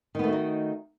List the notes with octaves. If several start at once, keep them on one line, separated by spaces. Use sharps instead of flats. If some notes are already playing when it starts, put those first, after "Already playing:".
D#3 A3 B3 D#4 F#4